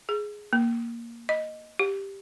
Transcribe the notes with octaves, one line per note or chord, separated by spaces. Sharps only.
G#4
A#3
D#5
G4